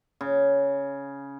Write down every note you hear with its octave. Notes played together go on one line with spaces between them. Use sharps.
C#3